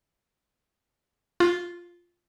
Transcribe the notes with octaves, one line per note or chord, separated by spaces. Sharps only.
F4